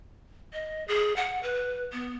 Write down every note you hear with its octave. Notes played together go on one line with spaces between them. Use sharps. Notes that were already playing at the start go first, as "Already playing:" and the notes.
D#5
G#4
F#5
B4
B3